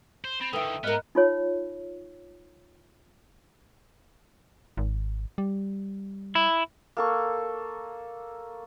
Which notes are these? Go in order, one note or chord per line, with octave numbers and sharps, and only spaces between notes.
C5
C4 B5 A6 F7
D3 D#3 E4 A4 B4 G5 D#6
G#2 B3 A#4 D#5 F6 F#6
D#4 F4 C#5
G#1
G3
E4
A#3 A4 C#6